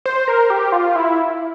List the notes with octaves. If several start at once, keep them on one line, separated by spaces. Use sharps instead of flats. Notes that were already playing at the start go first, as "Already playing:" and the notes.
C5
A#4
G4
F4
E4